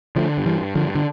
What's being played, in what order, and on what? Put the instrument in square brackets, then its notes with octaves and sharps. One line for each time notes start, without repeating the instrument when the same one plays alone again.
[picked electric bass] D3 F3 A3
G2
E3 G3
G2
D3 F3
G2
D3